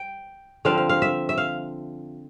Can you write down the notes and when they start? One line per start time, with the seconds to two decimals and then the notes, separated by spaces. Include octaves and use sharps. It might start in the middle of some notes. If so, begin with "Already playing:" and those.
Already playing: G5
0.65 D3 F3 C4 F5
0.78 F5
0.89 F5
1.02 E5
1.29 E5
1.38 F5